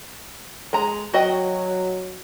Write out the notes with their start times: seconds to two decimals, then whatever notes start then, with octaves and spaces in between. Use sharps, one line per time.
0.73 G#3 A#5
1.14 F#3 F#4 D#5 G5